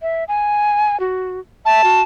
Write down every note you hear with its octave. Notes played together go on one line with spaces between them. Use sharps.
E5
G#5
F#4
E5 A5
F#4